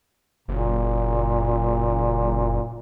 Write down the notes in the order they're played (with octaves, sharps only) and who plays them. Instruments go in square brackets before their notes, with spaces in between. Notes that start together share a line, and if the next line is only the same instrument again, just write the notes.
[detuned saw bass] F#1 [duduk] A#2